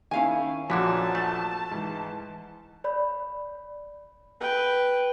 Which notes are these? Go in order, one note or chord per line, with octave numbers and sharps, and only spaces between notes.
D#3 C#4 E4 F5 G#5
A#1 F#2 D3 E3 F3 F#4 A5 B6
A3
G#2 E3
C#5 D5 B5
B4 G5